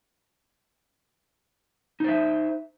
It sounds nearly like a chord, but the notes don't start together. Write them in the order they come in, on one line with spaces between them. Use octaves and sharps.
D#4 C5 E5